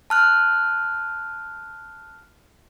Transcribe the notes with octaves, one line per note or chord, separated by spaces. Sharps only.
A5 F6 F#6